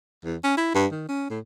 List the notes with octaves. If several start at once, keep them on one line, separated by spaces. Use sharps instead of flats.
E2
C#4
E4
G2
D#3
C#4
A2